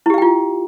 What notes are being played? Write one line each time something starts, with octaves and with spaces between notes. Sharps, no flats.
E4 F4 G4 F5 G5